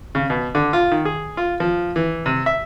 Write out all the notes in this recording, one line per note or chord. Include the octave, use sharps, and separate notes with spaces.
C#3
B2
D3
F4
D#3
G#4
F4
F3
E3
C3
E5